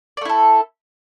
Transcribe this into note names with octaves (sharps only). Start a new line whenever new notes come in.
A3 E4 A4 D5